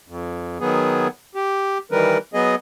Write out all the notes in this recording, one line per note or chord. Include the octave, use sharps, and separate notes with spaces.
F2
D#3 F#3 B3 G#4
G4
D#3 E3 G3 A#4 B4
F#3 B3 G#4 D#5